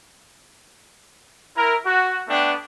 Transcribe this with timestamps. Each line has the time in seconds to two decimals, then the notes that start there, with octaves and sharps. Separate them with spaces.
1.57 E4 A#4
1.85 F#4
2.28 A3 B3 D4 G5